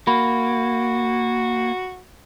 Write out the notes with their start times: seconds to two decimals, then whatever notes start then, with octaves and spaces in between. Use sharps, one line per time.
0.07 A#3 F#4 B5